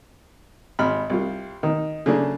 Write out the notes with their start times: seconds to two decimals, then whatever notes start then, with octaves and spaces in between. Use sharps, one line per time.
0.79 G#1 B5 F6
1.10 C2 F4
1.63 D#3
2.06 C#3 F#3 A3 A#3 D4